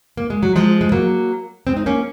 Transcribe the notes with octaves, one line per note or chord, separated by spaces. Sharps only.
A#3
G#3
F#3
F3 G#3
G#3
F#3 A#3
G#3 C4
D#4
A#3 C#4